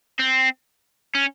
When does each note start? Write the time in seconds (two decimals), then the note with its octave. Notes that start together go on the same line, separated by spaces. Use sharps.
0.19 C4
1.15 C#4